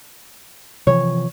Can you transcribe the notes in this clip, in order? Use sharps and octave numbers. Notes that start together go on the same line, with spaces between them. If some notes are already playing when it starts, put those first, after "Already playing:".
C3 E3 F3 C#5